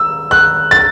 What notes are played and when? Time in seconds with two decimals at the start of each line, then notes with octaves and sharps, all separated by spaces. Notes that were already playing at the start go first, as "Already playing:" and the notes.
Already playing: E6
0.31 F#6
0.71 A6